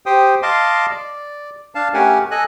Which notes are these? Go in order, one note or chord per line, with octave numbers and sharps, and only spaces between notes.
G4 C5 G5 D#6
D#5 F5 A5 C6 D6
D5
D4 F5 A5
A3 C#4 G4 A#4 F#5 G#5
A4 D#5 G#5 F#6